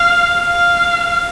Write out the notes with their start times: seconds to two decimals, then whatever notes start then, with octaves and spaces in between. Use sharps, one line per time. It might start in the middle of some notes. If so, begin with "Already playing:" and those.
Already playing: F5
0.47 F5